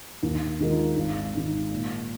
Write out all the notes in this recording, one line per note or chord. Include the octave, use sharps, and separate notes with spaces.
D#2
D#3 G#3 F4 A#4
G#1
G#2 D#3
A#2